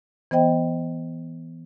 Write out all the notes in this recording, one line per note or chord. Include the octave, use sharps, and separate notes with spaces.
E3 B3 C5 D#5 G5